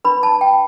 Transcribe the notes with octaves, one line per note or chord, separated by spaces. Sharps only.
D4 B4 B5
A5
G5